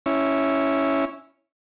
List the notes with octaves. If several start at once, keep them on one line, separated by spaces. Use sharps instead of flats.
C#4 E4